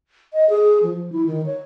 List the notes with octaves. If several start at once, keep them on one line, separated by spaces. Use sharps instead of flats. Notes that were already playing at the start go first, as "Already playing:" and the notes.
D#5
G#4
F3
E4
D#3
C#5